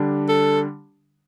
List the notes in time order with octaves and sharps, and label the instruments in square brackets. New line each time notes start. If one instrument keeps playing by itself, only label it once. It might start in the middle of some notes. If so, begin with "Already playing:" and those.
Already playing: [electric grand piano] D3 G3 D4
[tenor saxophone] A4